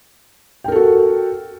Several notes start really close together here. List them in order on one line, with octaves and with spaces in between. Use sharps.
G5 A#4 A4 F#4